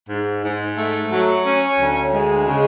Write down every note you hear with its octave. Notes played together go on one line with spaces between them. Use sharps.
G#2
G#2
A3
F#3
C#4
D2
G#3
C#3